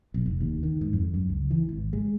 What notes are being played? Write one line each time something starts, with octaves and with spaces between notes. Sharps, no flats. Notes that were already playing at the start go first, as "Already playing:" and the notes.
B1
F1
D#2
D#3
G#2
F2
F#2
C#2
E3
G#1
G#3